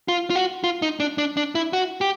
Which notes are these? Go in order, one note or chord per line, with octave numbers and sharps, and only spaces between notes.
F4
F4
F#4
F4
D#4
D4
D4
D4
E4
F#4
G4